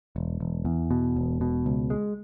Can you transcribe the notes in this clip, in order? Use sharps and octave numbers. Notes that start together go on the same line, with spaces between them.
E1
E1
E2
B2
E1
B2
C#2
G#3